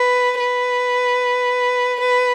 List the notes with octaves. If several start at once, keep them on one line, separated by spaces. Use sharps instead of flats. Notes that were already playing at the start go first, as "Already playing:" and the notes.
Already playing: B4
B4
B4